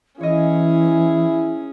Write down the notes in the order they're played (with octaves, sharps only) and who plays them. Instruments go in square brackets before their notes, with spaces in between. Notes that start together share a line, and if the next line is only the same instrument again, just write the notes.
[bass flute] E3 [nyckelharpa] C#4 G#4 [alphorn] E4 [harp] C#5 D#5